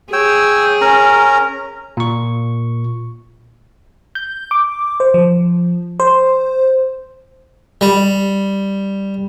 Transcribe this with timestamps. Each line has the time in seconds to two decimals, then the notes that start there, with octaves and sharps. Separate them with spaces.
0.13 G#4 C#5 G5 E6
0.81 C#4 A#4 A#5
1.97 A#2 C#6
4.15 G6
4.51 D6
5.00 C5
5.14 F3
6.00 C5
7.81 G3